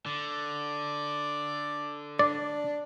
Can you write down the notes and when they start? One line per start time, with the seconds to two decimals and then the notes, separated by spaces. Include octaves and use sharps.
0.06 D3 D5
2.19 D4 D5